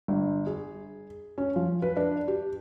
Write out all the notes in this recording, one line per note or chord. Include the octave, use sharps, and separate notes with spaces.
G1
G#4
C#4
F3
B4
D4
G4